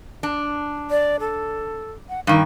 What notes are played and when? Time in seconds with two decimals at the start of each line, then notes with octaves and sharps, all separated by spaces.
0.23 D4
0.90 D5
1.20 A4
2.09 F#5
2.27 G2 D#3 C#6